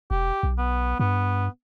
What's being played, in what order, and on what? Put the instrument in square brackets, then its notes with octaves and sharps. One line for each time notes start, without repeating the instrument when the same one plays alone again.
[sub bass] E1 [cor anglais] G4
[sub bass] B1
[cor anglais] B3
[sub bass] G2 [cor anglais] B3